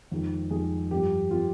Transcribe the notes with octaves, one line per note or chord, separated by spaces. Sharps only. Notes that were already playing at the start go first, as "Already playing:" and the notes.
F2 D#3 G#3
F2 D#3 G#3 G#4
G2 F3 C4 G4
F3 C4 F4